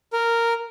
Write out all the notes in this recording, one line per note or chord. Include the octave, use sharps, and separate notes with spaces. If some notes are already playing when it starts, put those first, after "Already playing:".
A#4